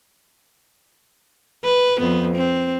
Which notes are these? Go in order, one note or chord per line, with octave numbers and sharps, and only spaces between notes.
B4
F2 B3
C4